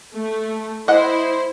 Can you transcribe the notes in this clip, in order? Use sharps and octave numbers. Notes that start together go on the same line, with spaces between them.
A3
E4 C5 D#5 F#5